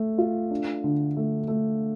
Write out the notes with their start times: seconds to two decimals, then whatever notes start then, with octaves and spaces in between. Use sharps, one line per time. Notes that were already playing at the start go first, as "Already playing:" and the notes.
Already playing: A3
0.18 F4
0.51 D4
0.84 D3
1.17 A3
1.48 A3